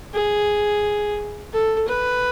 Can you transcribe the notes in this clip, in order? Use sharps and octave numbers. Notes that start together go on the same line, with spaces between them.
G#4
A4
B4